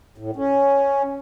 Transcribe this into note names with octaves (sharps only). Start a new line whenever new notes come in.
A2
C#4